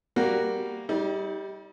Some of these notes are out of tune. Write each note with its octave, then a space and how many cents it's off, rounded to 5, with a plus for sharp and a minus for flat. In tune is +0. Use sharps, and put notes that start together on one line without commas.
G3 +0 A#3 +0 F#4 +0
G3 +0 D#4 +40